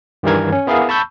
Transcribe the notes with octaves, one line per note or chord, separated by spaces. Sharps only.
G2 D#3 E3 G3 A#4 G#6
C#4
B3 E4 G#4 A#4 F5
A5 B5 C#6 E6 G6